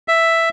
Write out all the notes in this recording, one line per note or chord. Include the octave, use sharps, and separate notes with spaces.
E5